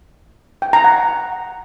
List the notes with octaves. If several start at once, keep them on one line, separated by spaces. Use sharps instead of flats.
G5
A#5
F#5